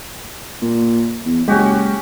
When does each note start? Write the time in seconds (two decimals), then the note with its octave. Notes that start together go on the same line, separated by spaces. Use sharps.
0.62 A#2
1.25 E2
1.48 F#1 G#3 C#4 F#4 G4